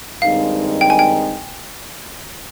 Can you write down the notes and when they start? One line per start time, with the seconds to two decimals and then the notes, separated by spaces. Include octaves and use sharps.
0.22 G2 D#3 G#3 C4 D#4 F5
0.81 G5
0.90 G#5
0.99 G5